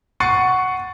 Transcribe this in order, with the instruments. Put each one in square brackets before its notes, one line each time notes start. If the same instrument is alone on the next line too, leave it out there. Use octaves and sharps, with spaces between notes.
[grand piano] F#5 C#6 A6 C7 C#7 D#7